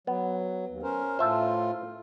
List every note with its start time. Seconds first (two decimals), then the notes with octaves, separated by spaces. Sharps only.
0.07 F#3 B3
0.68 D#2
0.83 C#4 A#4 C5
1.19 A2 F4 C5 E5 A5